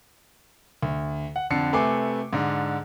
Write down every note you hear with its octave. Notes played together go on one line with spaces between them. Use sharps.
D2
F#5
F2 D3 A5 C7 C#7
C3 A3 B4 G#5 D6 C7
G#2 D3